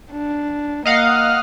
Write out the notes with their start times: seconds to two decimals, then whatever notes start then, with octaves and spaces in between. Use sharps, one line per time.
0.12 D4
0.85 A#3 D#5 F5 F#5